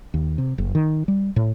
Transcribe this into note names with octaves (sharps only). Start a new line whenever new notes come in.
D#2
C3
F#1
D#3
G3
A2